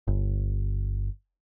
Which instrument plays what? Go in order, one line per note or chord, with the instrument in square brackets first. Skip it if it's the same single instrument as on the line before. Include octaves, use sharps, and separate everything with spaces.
[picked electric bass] G1